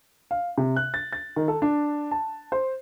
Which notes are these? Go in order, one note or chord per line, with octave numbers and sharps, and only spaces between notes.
F5
C3
F#6
A6
A6
D#3
A4
D4
A5
C5